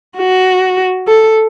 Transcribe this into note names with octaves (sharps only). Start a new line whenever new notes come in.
F#4
A4